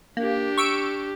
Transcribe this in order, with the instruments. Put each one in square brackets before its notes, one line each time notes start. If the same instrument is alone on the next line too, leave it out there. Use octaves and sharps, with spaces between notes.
[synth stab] A#3 [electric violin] D4 G4
[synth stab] C#6 E6 D7